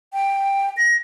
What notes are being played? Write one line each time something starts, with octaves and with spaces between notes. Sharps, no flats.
G5
A#6